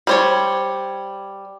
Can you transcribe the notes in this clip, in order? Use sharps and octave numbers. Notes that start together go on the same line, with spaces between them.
G3 C5 C#5